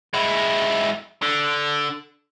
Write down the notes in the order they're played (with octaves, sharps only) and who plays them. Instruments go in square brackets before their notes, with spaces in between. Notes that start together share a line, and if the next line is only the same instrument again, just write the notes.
[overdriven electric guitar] G#3 E4
D3